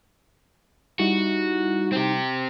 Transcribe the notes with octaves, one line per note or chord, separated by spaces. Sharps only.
G3 D#4 E4 F#4
C4 G4